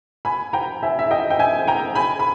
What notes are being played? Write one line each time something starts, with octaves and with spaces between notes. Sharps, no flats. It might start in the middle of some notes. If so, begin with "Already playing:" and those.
G#5 B5
G5 A#5
E5 G#5
E5
D#5 G5
G5
E5 G#5
G5 A#5
G#5 B5
B5